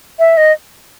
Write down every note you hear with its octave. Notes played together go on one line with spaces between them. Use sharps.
E5
D#5